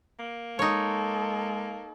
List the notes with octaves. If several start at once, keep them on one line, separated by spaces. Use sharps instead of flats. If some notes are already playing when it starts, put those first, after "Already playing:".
A#3
G#3 D#4 A4 C#5